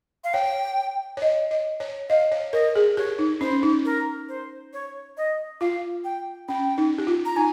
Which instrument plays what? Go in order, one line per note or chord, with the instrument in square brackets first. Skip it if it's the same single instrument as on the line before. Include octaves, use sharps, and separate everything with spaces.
[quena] F5
[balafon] C#5 [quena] G5
[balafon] C#5
D#5
D#5
C#5
[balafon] D#5 [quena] F5
[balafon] C#5
[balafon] A#4 [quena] D#5
[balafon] G#4
[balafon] G4 [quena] C#5
[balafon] D#4
[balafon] C#4 [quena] C5
[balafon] D#4
[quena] A#4
C5
C#5
D#5
[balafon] F4 [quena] F5
[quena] G5
[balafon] C#4 [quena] G5
[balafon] D#4
G4
F4
[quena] A#5
[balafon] D#4 [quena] G#5